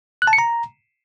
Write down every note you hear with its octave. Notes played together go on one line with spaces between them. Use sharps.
F#6
A5
C#7
A#5